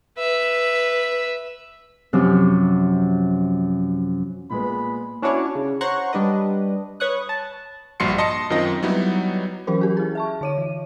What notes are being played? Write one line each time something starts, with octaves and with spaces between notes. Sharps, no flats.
B4 E5
F#2 C3 F3 F#3
A#2 G#3 B3 B5
C#4 D4 E4 F#4 C#5 D5
C#3
C5 C#5 F#5 A#5 C6 C#6
G3 D4 B4 D#5
B4 C#5 C#6 D#6 F#6
A5
A#1 G2 F#4 C6 C7 C#7
D#5 A5 C6 A#6 C#7
F#2 D#3 C4 F4 D#5
F#3 G3 B3 D#4 E4
E3 F#3 C#4 A#4 C5
F#4 G4
E4 G#4
E5 A5 C#6
D3 C#5 D#7
E3